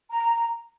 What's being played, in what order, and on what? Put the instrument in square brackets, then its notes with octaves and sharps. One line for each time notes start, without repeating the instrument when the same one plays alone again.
[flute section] A#5